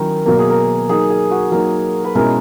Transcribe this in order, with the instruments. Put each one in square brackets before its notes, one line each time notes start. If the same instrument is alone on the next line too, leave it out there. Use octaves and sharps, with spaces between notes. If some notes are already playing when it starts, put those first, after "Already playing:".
Already playing: [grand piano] D#3 F#3 C#4 E4 [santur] A#4
[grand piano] B2 F#3 A#3 [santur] A#4
[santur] G#4
A#4
[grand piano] F#3 A#3 D#4 [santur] G#4
[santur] G#4
F#4
[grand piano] F#3 A#3 D#4 [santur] A#4
[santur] B4
[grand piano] B2 G#3 C#4 E4 [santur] A#4